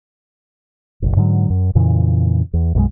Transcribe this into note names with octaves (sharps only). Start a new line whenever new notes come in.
F#1 B1
G#2 D3 E3 F#3
F#2
F2 A#2 C#3 E3
E2
B1 F#2 F#3 G#3